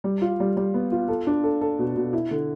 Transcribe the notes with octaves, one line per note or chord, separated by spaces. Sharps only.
G3
F4
G3
G3
B3
F4
A4
D4
A4
A4
B2
B2
E4
D3